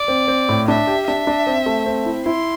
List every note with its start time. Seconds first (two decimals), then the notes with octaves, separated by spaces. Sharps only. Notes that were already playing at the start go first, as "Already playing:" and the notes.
Already playing: D5
0.08 C4
0.28 C4
0.49 A2
0.68 D4 E5
0.87 G4
1.07 D4 E5
1.27 D4
1.47 C4
1.66 A3
1.86 C4
2.06 E4
2.26 E4 C6